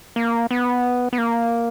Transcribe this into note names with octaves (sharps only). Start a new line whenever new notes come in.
A#3
B3
B3
A#3